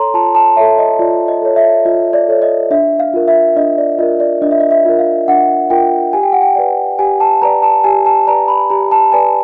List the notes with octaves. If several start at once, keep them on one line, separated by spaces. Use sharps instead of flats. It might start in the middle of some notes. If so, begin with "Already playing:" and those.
Already playing: A4 C#5 A#5 C6
F4 A5
A5
A4 C#5 E5
D#5
F4 D5
D#5
A4 C#5
E5
F4 D#5
D5
A4 C#5
D#5
D4 E5
F5
F4 A#4
E5
D4 D#5
D5
F4 A#4 D#5
D5
D4 D#5
E5
D#5
E5
F4 A#4
F5
D4 F#5
F4 A#4 G5
G4 G#5
G5
F#5
G5
B4 D5
G4 G#5
A5
B4 D5 A#5
A5
G4 G#5
A5
B4 D5 A#5
B5
G4 A#5
A5
B4 D5 G#5